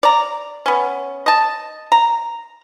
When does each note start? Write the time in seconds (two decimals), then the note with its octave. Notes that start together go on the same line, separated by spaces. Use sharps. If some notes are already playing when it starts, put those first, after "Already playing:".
0.03 D5 A#5
0.66 B3 C#4
1.26 D#5 A5
1.92 A#5